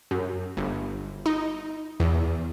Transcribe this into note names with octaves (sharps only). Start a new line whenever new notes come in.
F#2
G1
D#4
E2